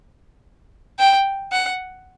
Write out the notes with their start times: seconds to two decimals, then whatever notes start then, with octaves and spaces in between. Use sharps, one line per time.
0.99 G5
1.52 F#5